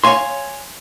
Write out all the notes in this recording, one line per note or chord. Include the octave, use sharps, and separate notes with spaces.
C#5 D5 F5 G#5 C6